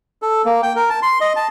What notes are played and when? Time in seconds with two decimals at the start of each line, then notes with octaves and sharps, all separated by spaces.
0.22 A4
0.45 A#3
0.63 G5
0.76 A#4
0.90 A5
1.03 C6
1.21 D#5
1.36 A5